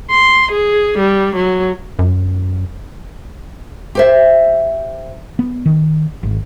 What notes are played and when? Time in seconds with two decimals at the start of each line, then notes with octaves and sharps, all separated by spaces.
0.11 C6
0.52 G#4
0.98 G3
1.36 F#3
1.99 F#2
3.95 G4 C5 E5
5.39 B3
5.66 D#3
6.23 G#1